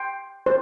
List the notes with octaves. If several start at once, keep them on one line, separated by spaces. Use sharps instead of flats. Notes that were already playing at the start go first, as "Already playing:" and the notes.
Already playing: G5 C6
C5